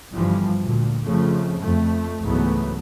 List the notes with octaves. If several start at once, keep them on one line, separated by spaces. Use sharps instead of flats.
G1 G2 E3 F3 G3
D2 A#2
F2 C#3 F3 A3
F2 A3
C#2 G#2 E3 F#3 A3 B3